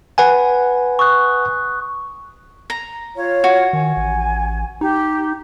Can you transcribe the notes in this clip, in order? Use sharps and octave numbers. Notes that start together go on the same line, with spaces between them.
B4 F#5 G#5
C#6 D#6 F#6
A#5
F4 C#5
F#4
D#3 G#5
A1
D#4 G4